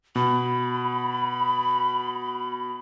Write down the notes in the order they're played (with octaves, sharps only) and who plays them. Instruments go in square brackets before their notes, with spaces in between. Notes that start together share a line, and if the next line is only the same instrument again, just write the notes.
[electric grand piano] B2 [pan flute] B5